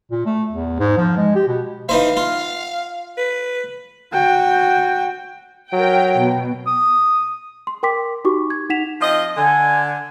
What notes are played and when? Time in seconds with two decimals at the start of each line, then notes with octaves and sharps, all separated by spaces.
0.11 A#2
0.26 A3
0.52 E2
0.80 G#2
0.98 F3
1.17 G#3
1.35 G4
1.47 B2
1.89 E3 D#4 C5 F5
2.17 F4
3.17 B4
4.13 F#4 G5
5.72 F#3 A#4 G5
6.18 B2
6.67 D#6
7.67 C6
7.83 A#4 G5 C6 D6 B6
8.25 D#4 F#4 G4 C#6 D6
8.50 G#6
8.70 D#4 F#5 B6 E7 F7
9.02 F3 C4 D#5
9.37 D3 G#5